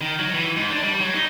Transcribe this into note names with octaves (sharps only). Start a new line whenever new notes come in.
D#3
F#3
E3
G#2
D4
G3
F#3
D#4